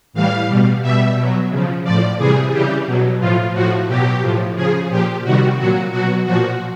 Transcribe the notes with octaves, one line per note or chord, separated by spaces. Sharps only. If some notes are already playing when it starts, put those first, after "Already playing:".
A2 E3 G3 F5
B2 G3
B2 G3 E5
B2 F#3
C#3 F3
A2 F3 D5
C3 E3 G3 G#4
C#3 E3 G3 G4
B2 F#3
A2 F3 F4
A2 F3 F#4
B2 F#3 G4
A2 F3
C#3 F3 G#4
A#2 F3 G4
C3 D#3 G3 F#4
A#2 F#3 F#4
B2 F#3 F#4
A#2 F3 F#4